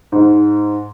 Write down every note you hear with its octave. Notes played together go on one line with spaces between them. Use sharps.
G#2